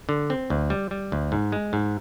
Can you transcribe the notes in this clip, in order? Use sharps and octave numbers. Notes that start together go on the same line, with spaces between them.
D3
C4
D2
G3
G3
D2
G#2
G#3
G#2